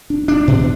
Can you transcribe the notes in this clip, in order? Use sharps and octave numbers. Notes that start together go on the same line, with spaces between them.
D4
D4
B2